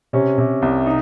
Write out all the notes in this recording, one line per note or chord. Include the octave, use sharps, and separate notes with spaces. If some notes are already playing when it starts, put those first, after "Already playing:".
C3 C#4
C3
C2
D#4